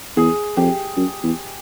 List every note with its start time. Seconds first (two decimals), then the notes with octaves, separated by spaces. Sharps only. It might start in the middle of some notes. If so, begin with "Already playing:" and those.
0.16 E2 G#4
0.57 F2 G4
0.97 F#2
1.23 E2